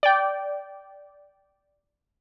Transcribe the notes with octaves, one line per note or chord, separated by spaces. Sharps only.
D5 G5